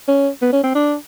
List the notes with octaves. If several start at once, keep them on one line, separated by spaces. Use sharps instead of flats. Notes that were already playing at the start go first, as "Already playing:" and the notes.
C#4
B3
C#4
C4
D4